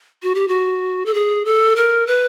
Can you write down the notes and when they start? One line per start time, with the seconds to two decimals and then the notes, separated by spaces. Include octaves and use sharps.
0.23 F#4
0.35 G4
0.48 F#4
1.06 A4
1.14 G#4
1.45 A4
1.76 A#4
2.07 B4